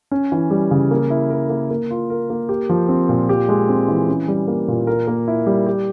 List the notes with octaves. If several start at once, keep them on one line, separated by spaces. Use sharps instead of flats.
C#4
E3
G3
C#3
A#3
E4
A#4
A#3
A#3
F4
A#4
A#3
G4
F3
C4
A#2
G4
G#3
C4
E3
C#4
G3
A#3
A#2
A#4
A#3
E4
G3
G4